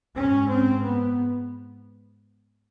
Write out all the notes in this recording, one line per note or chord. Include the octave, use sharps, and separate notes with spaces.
G#2 C#4
C4
B3